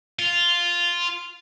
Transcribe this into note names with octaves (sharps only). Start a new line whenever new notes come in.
F4